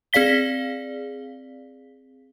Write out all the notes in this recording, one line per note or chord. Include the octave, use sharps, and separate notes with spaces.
C4 G#4 D5 F5 B6 G7